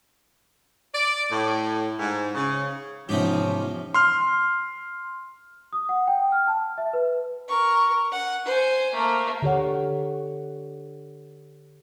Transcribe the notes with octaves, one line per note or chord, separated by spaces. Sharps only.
D5
A2
G#2
C#3
E2 G#2 C3 F3 C#4 D#4 G4
C6 F6
D#6
F#5
G5
F6
A5
E5
B4
A#4 C#6
F#5
C5 G#5
A3 A#3
D3 G4 C#5 F#5